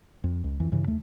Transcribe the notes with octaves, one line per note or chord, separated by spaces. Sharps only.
F2
C#2
F2 E3
G2 C#3 E3
D#2 A3